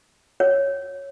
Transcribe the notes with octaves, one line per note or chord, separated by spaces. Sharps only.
C#5